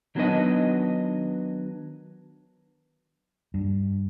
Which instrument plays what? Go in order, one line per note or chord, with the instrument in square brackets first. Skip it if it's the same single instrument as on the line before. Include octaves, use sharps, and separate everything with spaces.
[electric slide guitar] D#3 F#3 B3 D4 B4 D#5
[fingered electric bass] G2